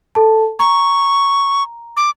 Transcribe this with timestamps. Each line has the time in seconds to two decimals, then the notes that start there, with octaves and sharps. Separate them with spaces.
0.15 A4 A5
0.59 A#5 C#6
1.97 D6